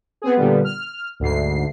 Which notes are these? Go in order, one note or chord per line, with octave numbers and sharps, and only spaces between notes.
B3 C4 G#4
A#2 D3 G3 B3
F6
D2 G#2 C7